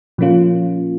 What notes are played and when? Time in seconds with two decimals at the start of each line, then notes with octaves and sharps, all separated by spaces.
0.18 A#2 F3 A#3 C#4 F4